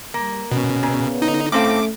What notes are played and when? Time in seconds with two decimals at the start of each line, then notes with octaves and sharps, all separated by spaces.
0.14 G3 A#3
0.52 B2 C#4
0.83 A#2 C#3 B3
1.22 D3 D#4
1.52 A2 A3 C4 C#4 F5 D6